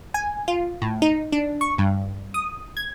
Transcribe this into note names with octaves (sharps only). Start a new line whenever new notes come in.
G#5
F4
A2
D#4
D4
C#6
G2
D#6
G#6